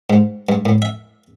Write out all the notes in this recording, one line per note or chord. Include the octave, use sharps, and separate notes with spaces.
G#2
G2
A2
E5